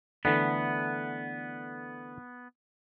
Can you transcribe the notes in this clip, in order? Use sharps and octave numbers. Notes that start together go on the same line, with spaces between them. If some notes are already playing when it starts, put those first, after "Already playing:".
D3 E3 A3 B3